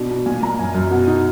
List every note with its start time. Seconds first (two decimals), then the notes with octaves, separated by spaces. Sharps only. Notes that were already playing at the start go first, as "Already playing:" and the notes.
Already playing: B2 D4
0.10 B2
0.26 A#2 G#5
0.43 A#2 A#5
0.59 F#2 G#5
0.74 F#2
0.91 B2 F#5
1.07 D#4